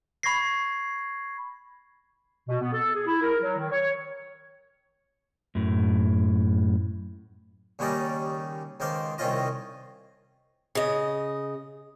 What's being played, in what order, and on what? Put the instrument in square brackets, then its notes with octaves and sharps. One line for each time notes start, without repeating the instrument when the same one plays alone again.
[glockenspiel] B5 C#6 G#6 A#6 C7
[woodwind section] B2
B3
A4
G#4
E4
A#4
F#3
D#3
C#5
[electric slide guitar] F#2 A2
[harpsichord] D#2 C#3 G3 C#4 D#4 D5
C#2 D#3 C5 F5 D6
C2 D#3 C4 C#4 F4 D#5
[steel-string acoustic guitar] C#3 D#5